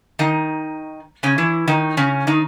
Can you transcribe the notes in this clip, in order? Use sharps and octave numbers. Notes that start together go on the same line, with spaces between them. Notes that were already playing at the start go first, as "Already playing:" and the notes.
D#3 D#4
C#3 C#4
E3 E4
D#3 D#4
C#3 C#4
D#3 D#4